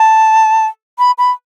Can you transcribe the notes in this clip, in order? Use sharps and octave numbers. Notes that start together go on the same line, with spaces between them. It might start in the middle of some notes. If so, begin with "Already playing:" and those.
Already playing: A5
B5
B5